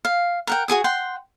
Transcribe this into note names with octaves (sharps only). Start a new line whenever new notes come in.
F5
A#4 F#5 G5
F#4 G#4 G#5 D#6
F#5 G5 C6